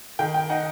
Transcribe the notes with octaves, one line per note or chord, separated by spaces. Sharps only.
D#3 G5
G5
D#4 F#5